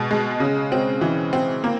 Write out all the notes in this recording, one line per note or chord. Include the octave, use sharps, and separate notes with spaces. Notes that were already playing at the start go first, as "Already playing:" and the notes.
Already playing: B2 G#3
G#3
C#3
C4
E3
C4
A#3